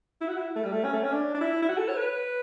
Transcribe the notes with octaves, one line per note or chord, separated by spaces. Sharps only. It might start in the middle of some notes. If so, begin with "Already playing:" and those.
E4
F#4
E4
A3
G3
A3
C#4
A3
C#4
D4
D4
E4
E4
F#4
A4
C#5
B4